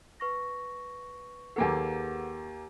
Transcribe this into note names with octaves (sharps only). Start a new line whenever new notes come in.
B4 C#6 A#6
D#2 A#3 G#4 A4 B4 F#5